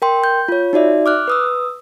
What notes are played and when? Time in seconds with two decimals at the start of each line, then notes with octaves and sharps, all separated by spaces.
0.02 A#4 G5 C6
0.24 G6
0.48 F4 C#5
0.73 D#4 F#4 D5 E5
1.06 D6 F6 F#6
1.28 B4 D#6 E6